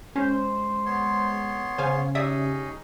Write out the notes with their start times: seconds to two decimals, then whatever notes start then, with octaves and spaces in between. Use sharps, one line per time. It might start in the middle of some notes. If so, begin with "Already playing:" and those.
0.16 G#3 C#4 C5
0.86 B3 C#5 C6
1.78 C#3 C5 F5 G#5
2.15 C#4 D#4 G4 G#4 D5 E5 D#6